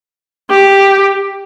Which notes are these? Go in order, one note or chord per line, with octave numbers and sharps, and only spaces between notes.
G4